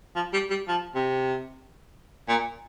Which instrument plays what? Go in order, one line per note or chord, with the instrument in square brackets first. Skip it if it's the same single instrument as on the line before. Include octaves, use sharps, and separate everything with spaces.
[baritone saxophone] F3
G3
G3
F3
C3
A#2